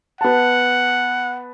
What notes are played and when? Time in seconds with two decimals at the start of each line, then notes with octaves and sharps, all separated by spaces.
0.21 B3 F#5 A5